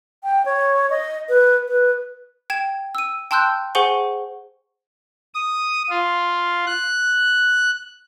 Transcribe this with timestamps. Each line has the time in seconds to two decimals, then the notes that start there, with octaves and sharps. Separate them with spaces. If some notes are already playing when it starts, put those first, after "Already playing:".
0.24 G5
0.45 C#5
0.90 D#5
1.29 B4
1.68 B4
2.50 G5 G#6 E7
2.95 E6 D#7
3.31 G5 A5 C6 E6 F#6 G6
3.75 G#4 C5 F#5 G#5 C#6 G7
5.34 D#6
5.89 F4
6.67 F#6